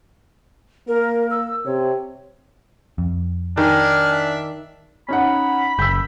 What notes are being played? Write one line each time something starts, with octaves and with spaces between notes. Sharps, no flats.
A#3 A#4
E6
C3 C#5
F2
D#3 D4 G#5 F6
E5
C#4 D#4 F#5 B5
F#1 E6 G6